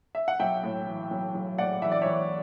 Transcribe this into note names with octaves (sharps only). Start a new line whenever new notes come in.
E5
F#5
B1 E5 G5
A2
E3
B1
B1
A2 D5 F#5
E3 E5
D5
E3 C#5 E5